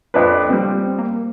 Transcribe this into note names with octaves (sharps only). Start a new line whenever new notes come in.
F2 D4 B4
F3 G3 C4
A#3